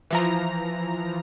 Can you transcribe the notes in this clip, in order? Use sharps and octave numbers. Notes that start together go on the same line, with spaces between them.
E3 F3 A#5